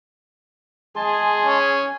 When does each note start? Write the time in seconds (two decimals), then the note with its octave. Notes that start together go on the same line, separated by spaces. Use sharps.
0.96 G#3 G#4 G#5 A5 C6
1.46 C#4